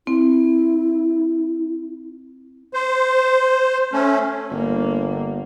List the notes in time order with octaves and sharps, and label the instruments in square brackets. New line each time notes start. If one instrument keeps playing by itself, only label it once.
[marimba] C4 [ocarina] E4
[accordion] C5
A3 C#4
[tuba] G1 [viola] A#3